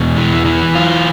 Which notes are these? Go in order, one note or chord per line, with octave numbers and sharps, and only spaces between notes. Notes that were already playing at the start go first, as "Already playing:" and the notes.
Already playing: E2 B2
E3
E3
F4